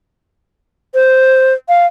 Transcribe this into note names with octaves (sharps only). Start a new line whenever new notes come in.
C5
F5